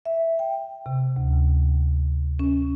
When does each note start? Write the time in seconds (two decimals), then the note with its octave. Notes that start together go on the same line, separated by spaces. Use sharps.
0.05 E5
0.39 G5
0.86 C3
1.16 D2
2.39 C#4